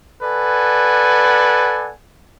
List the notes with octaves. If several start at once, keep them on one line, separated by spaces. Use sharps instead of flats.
A4 B4 D5 F#5 G#5